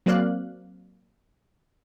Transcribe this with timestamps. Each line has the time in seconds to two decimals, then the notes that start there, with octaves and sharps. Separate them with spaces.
0.06 F#3 A#3 C4 D5 F5 F#6